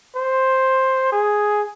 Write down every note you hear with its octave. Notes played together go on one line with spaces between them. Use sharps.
C5
G#4